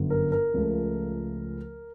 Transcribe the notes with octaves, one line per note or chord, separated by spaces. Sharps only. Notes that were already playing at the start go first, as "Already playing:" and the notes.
Already playing: G1 F#2 D3
A#4
A#4
C#2 C#3 F3 A3